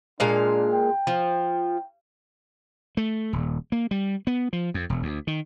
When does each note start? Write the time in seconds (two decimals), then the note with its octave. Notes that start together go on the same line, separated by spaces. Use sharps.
0.20 A#2 G#3 D4 F5
0.72 G5
1.07 F3
2.97 A3
3.33 D#1
3.72 A#3
3.91 G3
4.27 B3
4.53 F3
4.74 F2
4.90 E1
5.03 D2
5.27 D#3